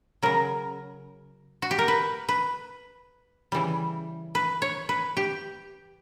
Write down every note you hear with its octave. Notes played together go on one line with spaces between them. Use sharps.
C#3 F#3 A#4
F#4
G4
A#4
B4
B4
C#3 E3 G3
B4
C#5
B4
G4